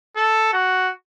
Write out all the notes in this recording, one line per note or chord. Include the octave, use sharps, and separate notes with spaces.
A4
F#4